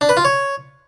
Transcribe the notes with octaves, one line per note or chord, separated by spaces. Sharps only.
D4
B4
F4
C#5